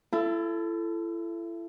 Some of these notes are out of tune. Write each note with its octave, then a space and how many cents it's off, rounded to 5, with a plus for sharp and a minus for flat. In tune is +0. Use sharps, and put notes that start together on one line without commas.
E4 +35 A4 +0